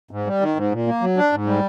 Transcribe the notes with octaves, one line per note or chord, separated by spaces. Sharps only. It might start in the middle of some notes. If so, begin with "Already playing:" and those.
G#2
G3
D#3
G#2
A#2
A#3
F#3
D4
G#2
G3